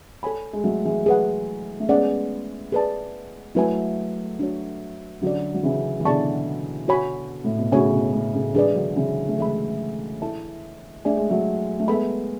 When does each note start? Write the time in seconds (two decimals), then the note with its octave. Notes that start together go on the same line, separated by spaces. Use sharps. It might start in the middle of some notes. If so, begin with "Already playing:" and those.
0.23 A4 C#5 G#5 B5
0.53 G#3
0.64 F#3 A3
0.85 E3 G#3
1.06 G#4 B4 F#5
1.80 A3
1.89 G#3 B3 C#4 G#4 D5 F#5
2.72 G#4 B4 D5 A5
3.55 F#3 A3 E4 B4 E5 G#5
4.40 D4 F#4 C#5
5.22 D3 F#3 C#4 F#4 A4 D5
5.54 F#3
5.63 C#3 E3
6.00 E3
6.05 B2 D3 E4 G#4 D5 A5 C#6
6.88 F#4 C#5 G#5 B5
7.44 A2
7.59 B2
7.72 A2 C#3 C#4 F#4 C#5 G#5
7.93 B2
8.13 A2
8.34 A2 C#3
8.55 E3 G#3 D4 G#4 B4 D5
8.75 D3 F#3
8.96 C#3 E3
9.28 A3
9.38 E3 G#3 A4 E5 B5
10.22 E4 A4 E5 A5
11.05 A3 D4 G#4 D5 G#5
11.17 G#3
11.30 F#3 A3
11.79 A3
11.88 G#3 B3 A4 E5 B5